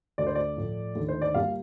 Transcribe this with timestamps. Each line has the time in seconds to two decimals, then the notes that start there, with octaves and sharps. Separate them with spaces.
0.18 D2 D3 A3 D5
0.27 C5
0.35 D5
0.57 A2 F3 A3
0.95 D#2 D3 A3
1.09 C5
1.22 D5
1.34 A#2 G3 A#3 F5